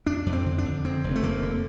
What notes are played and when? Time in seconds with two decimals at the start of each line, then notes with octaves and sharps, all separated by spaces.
0.06 F2 D4
0.26 F2
0.33 C4
0.46 D3
0.58 D4
0.65 F2
0.84 F2 C4
1.04 F1
1.15 A3
1.23 F1 A#3
1.43 D3